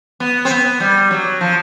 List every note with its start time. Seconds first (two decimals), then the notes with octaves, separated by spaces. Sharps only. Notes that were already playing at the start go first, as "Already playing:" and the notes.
0.20 B3
0.45 C4
0.51 B3
0.80 G3
1.11 F#3
1.41 F3